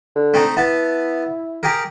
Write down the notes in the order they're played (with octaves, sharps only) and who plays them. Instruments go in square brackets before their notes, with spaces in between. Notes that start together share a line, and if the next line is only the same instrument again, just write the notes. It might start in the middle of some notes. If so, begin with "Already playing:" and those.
[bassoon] D3
[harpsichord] A3 C4 D#4
[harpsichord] B3 A5 [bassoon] E4
[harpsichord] G4 G#4 A#4